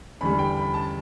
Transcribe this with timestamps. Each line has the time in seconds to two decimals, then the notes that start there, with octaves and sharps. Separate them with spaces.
0.21 E2 D3 G3 B5
0.39 G5
0.56 B5
0.74 A5